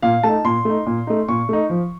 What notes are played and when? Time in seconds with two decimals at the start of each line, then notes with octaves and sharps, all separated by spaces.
0.02 A#2 F5
0.23 A3 D#4 A5
0.45 A#2 C6
0.65 A3 D#4
0.86 A#2
1.07 A3 D#4
1.28 A#2 C#6
1.49 A3 D#4
1.70 F3